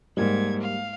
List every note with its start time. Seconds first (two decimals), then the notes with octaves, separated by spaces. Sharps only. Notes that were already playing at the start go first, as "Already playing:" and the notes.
0.17 G#2 G3 A#3 G#6
0.58 F5